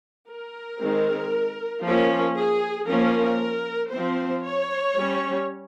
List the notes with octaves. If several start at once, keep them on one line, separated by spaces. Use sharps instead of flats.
A#4
D#3 G#3 C4
F3 A#3 C#4
G#4
F3 A#3 C#4 A#4
F3 C4 C5
C#5
G3 C#4